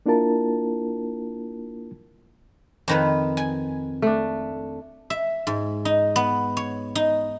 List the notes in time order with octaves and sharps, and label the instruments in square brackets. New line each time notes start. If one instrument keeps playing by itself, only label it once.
[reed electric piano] A#3 D4 E4 F4 A#4 A5
[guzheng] F2 D#3 B4
G#5
[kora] A3 D4
[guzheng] E5
G#2
D#4
B3
C#5
D#4